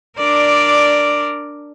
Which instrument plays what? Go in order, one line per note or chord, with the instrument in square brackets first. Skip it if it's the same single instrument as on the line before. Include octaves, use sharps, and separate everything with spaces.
[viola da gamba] D4 A#4 D5